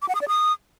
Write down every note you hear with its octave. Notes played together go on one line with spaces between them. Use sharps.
D6
F#5
D#6
D5
D#6